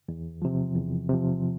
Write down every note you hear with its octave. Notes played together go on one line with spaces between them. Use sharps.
E2
C3 F3
E2
C3 F3